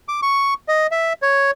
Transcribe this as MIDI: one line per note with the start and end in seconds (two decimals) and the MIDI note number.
0.08 0.20 86
0.23 0.54 85
0.68 0.87 75
0.91 1.13 76
1.22 1.51 73